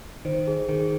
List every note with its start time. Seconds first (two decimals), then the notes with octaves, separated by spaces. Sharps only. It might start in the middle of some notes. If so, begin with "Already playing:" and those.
0.25 D#3 C5
0.47 G#4
0.68 D#3 G#4